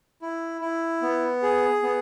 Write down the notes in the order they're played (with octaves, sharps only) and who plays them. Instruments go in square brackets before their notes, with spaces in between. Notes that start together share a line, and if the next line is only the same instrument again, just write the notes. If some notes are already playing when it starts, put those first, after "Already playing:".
[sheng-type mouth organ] E4
E4
B3
G#4
B3